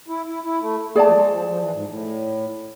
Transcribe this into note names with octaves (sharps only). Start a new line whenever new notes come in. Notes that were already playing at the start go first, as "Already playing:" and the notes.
E4
E4
E4
A3
A3 G#4 D5 A5
F3
G#3
F3
F3
E3
G#2
A2